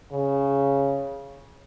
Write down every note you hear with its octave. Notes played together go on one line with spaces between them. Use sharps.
C#3